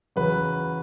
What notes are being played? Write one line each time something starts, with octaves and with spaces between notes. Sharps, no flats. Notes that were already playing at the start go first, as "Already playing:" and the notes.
E2 C#3 F#3 B4